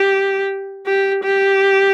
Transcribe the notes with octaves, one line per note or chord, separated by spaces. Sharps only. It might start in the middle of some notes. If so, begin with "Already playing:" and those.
Already playing: G4
G4
G4